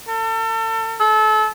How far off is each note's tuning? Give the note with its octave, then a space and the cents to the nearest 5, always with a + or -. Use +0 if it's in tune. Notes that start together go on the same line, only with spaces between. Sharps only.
A4 +35
A4 -30